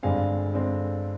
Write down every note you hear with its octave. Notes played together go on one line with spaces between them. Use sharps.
G1 G2 D3 G#3 C4 F5 G#5
D3 G#3 C4